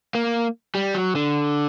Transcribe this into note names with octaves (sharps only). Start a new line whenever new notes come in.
A#3
G3
F#3
D3